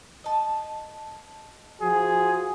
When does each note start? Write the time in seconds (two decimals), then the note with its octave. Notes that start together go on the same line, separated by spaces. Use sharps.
0.24 D#5 A5
1.81 F3 F#4 G#4